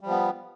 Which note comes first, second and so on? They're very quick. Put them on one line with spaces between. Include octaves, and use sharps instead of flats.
G3 F3 B3